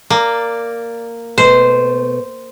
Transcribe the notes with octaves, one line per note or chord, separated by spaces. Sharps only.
A#3 D5
B2 A3 C5